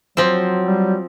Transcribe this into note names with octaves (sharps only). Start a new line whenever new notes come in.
F3 F#3 C4
G3